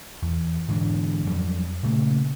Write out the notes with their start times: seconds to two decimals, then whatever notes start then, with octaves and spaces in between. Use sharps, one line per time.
0.22 E2
0.68 G#2 D3 E3 D4
1.26 F2 F#3 G3
1.83 A#2 C#3 A3 A#3